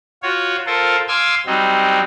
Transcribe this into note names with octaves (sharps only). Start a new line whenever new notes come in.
F4 F#4 C#5
F4 A4 A#4 C5
F5 G#5 C6 D6 E6
F#3 G3 C4 D#4